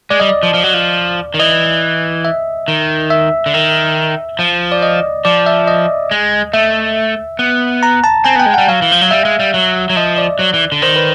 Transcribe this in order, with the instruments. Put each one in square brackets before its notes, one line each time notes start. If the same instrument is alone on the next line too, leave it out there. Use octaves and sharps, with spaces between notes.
[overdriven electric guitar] G#3 [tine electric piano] D5
[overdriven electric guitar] G3 [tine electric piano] D#5
[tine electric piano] D5
[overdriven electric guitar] F3
F3
F#3
F3
D#3
[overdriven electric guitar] E3 [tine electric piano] D#5
[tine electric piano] E5
[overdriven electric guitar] D#3
[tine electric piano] E5
[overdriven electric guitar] D3
D#3
F3
[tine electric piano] D5
D#5
[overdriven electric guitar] F3 [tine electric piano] D5
[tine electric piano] E5
D#5
[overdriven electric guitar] G#3
[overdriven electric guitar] A3 [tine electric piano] E5
[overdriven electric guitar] B3
[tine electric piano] A#5
A5
[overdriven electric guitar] C4 [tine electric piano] G#5
[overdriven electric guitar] B3 [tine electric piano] G5
[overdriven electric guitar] G#3
[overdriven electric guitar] G3 [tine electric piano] F#5
[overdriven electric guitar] F#3 [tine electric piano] F5
[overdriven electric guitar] E3
F3
F#3
[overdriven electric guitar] G3 [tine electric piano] E5
[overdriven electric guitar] G#3
G3
F#3
F#3
[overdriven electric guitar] F3 [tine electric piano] D#5
[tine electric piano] D5
[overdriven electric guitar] F#3
E3
D3
[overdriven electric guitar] D#3 [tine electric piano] C5
[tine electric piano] B4